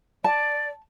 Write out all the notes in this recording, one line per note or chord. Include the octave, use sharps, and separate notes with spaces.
D5 A5